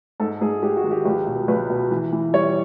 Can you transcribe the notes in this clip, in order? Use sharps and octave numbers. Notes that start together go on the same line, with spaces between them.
G#2 A4
G#2 G#4
G#3 G4
F#4
D#3
G4
C#2 G4
B2
C#2 B4
B2
E3
E3
G3 C#5